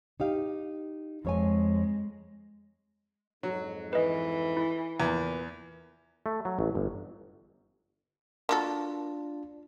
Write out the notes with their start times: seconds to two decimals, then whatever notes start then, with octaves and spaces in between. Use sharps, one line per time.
0.20 D#4 G4 F5
1.25 F2 G#3 C#5 G#5
3.43 F2 G#2 F#3
3.93 E3 B4 D#5
4.57 E4
5.00 E2 A#2 B4
6.26 A3
6.45 F#3
6.59 A1
6.75 G1
8.49 A#3 D4 F4 F#4 A4